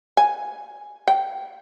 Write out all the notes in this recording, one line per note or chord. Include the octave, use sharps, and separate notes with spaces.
G#5
G5